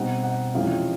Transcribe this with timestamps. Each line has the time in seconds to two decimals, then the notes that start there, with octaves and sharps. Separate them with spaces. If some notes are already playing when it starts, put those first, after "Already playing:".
Already playing: B2 G3 C4 D#4 F#5
0.23 F#5
0.54 F2 C3 E3 G#3 C#4 F5